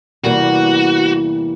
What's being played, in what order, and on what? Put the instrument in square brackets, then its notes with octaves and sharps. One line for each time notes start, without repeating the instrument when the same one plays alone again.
[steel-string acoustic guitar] E2 C3 E3 G3 A#3 [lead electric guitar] F#4